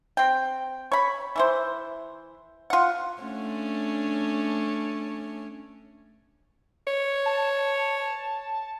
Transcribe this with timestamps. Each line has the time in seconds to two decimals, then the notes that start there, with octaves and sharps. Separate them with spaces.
0.17 C4 G5
0.92 C#5 B5
1.36 E3 E4 C5
2.70 F4 F#5
3.22 A3 C#4 D4
6.87 C#5
7.26 A5